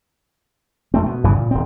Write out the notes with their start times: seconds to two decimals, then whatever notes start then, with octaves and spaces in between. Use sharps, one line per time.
0.94 F2 A3 C4
1.06 B2
1.24 G1 G2 C#3 E3
1.35 A#2
1.51 D#1 C4